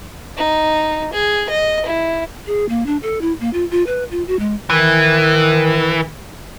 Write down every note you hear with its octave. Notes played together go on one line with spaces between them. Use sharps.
D#4
G#4
D#5
E4
G#4
A#3
D4
A4
E4
A#3
F4
F4
B4
F4
F#4
G#3
D#3 E3